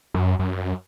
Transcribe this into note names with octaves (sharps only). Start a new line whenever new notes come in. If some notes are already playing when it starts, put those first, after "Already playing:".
F#2
F#2